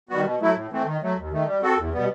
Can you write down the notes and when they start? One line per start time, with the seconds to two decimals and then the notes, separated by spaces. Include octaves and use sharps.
0.09 D#3 G3 B3 F#4
0.23 B2
0.40 F#3 A3 E4
0.55 A2
0.70 E3 A3 C4
0.85 D#3
1.01 F#3 A3
1.17 D#2
1.31 D#3 A3
1.46 G3
1.62 C4 F#4 A4
1.77 E2
1.93 B2 G3 B3